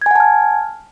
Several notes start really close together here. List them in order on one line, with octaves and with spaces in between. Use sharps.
G#6 G#5 F#5 A5 F6